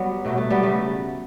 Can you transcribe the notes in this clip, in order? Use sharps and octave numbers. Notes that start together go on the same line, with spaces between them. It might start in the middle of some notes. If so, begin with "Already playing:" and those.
Already playing: F#3 G3 B3
B2 F#3 A3
A3
G3 B3
C#3 F#3 A3